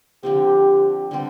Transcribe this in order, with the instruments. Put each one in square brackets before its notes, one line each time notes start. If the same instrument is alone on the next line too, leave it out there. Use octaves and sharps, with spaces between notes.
[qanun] D3 F3 C4 [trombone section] G4
[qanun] D3 G3 C4